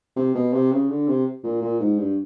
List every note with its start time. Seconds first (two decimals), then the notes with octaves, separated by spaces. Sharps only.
0.16 C3
0.35 B2
0.53 C3
0.71 C#3
0.90 D3
1.08 C3
1.44 A#2
1.62 A#2
1.80 G#2
1.99 G2